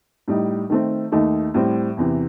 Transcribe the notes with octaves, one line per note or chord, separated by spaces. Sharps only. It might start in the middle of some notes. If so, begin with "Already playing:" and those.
A2 G3 D#4
D#3 A3 C4
D#2 D#3 A3 D#4
A2 G3 C4
E2 C3 E3